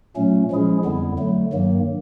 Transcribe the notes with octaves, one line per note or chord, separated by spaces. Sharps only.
A#2 F#3 A3 C#4
F3 G#3 C#4 E4 G#4
F2 D3 G3 B3 E4
D3 F#3 A3
G2 D#3 F#3 A#3